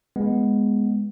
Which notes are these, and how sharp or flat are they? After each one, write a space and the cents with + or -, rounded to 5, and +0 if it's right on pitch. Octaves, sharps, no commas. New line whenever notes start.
G#3 +0 B3 +0